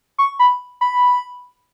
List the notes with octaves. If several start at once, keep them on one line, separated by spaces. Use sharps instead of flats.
C#6
B5
B5